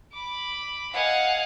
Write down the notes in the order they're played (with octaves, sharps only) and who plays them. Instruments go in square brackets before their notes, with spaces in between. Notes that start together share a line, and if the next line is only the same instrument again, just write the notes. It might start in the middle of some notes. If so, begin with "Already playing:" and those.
[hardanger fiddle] B5 D6
[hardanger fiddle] D#5 F5 [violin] F#5 G#5